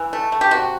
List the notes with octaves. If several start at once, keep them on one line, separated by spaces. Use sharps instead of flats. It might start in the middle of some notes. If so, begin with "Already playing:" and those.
Already playing: E3
A3
A3
G4
C3 F#4